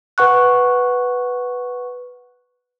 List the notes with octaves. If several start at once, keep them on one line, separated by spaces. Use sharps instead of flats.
B4 F#5 C#6 F#6